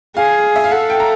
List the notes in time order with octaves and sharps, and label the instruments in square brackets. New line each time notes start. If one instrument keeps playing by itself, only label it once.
[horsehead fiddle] G#4 [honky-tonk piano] F5
[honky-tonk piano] E5
F5
[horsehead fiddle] A4 [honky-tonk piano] F#5
[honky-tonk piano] G5
A#5